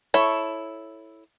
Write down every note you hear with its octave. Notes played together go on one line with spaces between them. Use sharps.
E4 A4 C#5